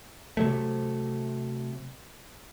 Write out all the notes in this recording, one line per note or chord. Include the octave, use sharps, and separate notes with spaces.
C3 F#3 A3